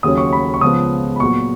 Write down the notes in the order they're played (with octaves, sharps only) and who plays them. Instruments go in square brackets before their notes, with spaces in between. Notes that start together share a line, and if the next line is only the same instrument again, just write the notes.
[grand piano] D#2 C#3 F#3 C#4 D#6
C#6
B5
C#6
C#2 C#3 F3 B3 D#6
B5
A#2 F#3 B3 C#6